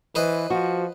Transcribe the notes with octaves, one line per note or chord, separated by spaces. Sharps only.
E3 B4 C5 D#5
F3 F#4